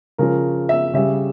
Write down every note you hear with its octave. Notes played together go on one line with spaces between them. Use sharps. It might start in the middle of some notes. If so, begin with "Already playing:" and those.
C#3 F3 A#4
E5
C#3 G3 E5